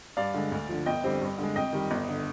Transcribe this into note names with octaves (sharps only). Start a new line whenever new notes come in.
G2 D5 F5
D3 G#3
D2
D3 F3
G1 D#5 G5
F2 D3 G3 C4
G2
D3 G#3
F2 D#5 G5
D#3 G3
G1
D3